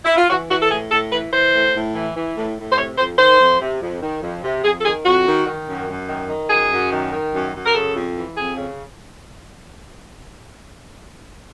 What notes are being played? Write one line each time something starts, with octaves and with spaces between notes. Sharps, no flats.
E4
F4
E3 F#4
E3 F#4
A4
A2 G#4
A2 A4
E3 B4
E3 C5
A2
A2
E3
E3
A2
A2
C5
C3 C#5
F2 C5
D#3 C5
F2
C3
F2
D#3
F2
C3
F2 G#4
A4
D#3 G#4
F2 F#4
D#3
D#3
F#2
F#2
D#3
D#3
F#2 G#4
F#2
D#3
D#3
F#2
F#2
A#4
C#3 A4
F2
E3
F2 G#4
C#3